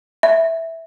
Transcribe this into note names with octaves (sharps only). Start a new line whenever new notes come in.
E5